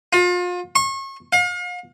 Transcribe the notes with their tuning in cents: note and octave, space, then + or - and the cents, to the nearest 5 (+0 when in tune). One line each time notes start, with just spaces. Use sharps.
F4 +35
C#6 -35
F5 +40